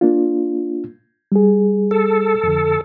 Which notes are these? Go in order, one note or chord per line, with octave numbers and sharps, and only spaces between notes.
A#3 D4 F4
G3 G#4
A4
F2 D3